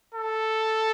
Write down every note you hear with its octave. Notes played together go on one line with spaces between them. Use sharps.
A4